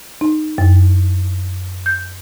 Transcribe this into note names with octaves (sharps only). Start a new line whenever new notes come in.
D#4
F#2
G6